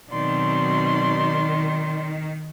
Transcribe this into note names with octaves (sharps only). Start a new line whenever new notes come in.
B2 D#3 F#3 C4 D5 C6